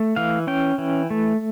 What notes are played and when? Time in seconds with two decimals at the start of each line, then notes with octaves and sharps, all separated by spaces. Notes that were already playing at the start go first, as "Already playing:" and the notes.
Already playing: A3
0.16 E3 F5
0.47 C#4 G5
0.78 E3
1.10 A3